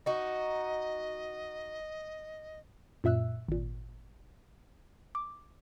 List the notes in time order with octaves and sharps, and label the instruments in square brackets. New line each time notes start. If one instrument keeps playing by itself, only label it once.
[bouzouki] D#4 F#4 [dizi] D#5
[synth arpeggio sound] F#2 A#2 E5 E6 F#6
G#1 A#2
D6